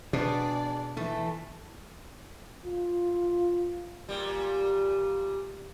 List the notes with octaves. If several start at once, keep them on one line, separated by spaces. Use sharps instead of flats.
B2 D4 G#4 D5
E3 A3
F4
A#2 G3